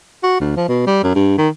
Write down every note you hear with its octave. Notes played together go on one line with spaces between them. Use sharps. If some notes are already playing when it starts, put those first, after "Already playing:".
F#4
D2
F3
B2
G3
F#2
G2
D#3